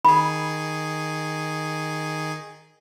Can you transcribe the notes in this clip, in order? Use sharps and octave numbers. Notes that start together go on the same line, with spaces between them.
D#3 G#4 B5